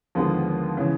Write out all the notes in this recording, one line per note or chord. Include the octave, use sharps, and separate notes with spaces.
D#2 D3 F3 G#3 B3
C#3 E3